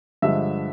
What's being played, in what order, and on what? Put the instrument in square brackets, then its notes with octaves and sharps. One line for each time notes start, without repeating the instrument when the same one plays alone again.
[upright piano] G2 D3 F3 G#3 E5